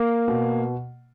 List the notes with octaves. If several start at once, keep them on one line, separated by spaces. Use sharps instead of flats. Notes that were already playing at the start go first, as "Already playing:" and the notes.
Already playing: A#3
B2